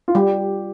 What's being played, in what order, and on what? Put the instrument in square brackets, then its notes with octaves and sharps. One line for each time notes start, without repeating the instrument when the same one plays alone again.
[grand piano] F4
[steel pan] G3 [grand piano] G4